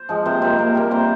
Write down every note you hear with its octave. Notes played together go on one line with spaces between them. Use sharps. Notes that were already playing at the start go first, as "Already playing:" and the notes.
Already playing: C5
F3 G#3
C3 C5
G3 A#3 C5
C3 A#4
G3 A#3
C3 C5